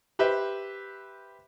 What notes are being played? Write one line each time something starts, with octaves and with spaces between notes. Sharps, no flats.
G4 B4 C5 E5